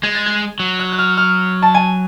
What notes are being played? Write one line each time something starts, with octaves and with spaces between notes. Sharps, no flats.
G#3 G#6
A6
G#6
F#3
F#6
F#6
F6
F6
A5
G#5